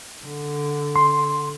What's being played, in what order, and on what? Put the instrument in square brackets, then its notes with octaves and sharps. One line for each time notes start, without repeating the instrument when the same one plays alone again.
[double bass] D3
[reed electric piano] C6